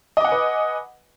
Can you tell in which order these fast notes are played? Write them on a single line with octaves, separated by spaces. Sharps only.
D#5 D6 F#5 G#5 B4